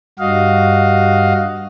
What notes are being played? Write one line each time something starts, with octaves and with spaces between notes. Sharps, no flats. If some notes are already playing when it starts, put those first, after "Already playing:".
G2 F#4 D#5 F5